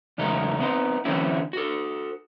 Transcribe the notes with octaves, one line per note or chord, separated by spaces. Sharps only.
E2 C#3 F#3 G#3 A3 D#4
B3 C4 D#4
D3 E3 F#3 C4 C#4 E4
F#4 A4